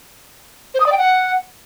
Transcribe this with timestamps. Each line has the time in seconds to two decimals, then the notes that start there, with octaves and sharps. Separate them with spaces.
0.74 C5
0.80 D#6
0.86 D5
0.92 G5
0.98 F#5